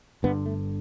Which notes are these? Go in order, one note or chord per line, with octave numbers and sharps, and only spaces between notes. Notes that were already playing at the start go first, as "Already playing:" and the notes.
G1 G2 D3 B3
A3